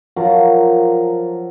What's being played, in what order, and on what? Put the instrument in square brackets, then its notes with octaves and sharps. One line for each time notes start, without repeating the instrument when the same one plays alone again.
[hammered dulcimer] F3 F#3 A#4